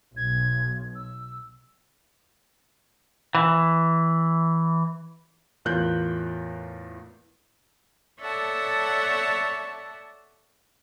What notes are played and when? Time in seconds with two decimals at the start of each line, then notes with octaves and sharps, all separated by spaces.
0.17 B1 G#6
0.95 E6
3.35 E3
5.65 E2 A2 F4 A#4 F#6 G6
8.19 A4 C#5 D5 E5 F#5 A5